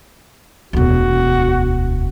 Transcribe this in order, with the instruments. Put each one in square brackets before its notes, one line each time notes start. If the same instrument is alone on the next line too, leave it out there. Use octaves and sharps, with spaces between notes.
[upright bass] E1 D2 [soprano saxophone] F#4